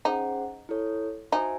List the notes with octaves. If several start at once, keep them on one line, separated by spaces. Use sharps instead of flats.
C#4 D#4 G#4 C5 F#5
E4 A4 C#5
D#4 F#4 C5 E5 G#5